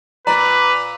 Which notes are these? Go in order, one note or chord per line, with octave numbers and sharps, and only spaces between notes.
A#2 B4 D5 A#5